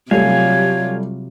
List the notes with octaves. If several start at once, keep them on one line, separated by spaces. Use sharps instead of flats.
C3 F#3 G3 A3 F4 C#5 F5 G#5